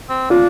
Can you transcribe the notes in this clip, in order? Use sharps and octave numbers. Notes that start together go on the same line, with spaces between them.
C4
D4 F4